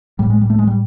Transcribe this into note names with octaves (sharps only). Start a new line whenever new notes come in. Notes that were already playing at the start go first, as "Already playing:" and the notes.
A2 G3
G#3
G3
A3
G#3
G3